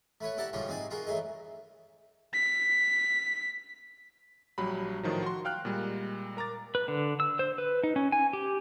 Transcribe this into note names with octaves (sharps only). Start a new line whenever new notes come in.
A3 B4 C#5
E4 G4 D5 F#5 A5 A#5
G#2 D3 F3 G3 F4 C#5
C4 D#4 G#4 D5
F4 F#4 G#4 A#4
E3 F#3 A3 G#4 D#5
B6
A#1 F#3 G3 B5
A2 D#3 F3 F#3
F#4 C6
F5 G5 F6 F#6
A#2 G3 G#3
A#4 A#5 D6 A6
B4
D3
E6
C5
B4
D#4
C#4
G#5
G4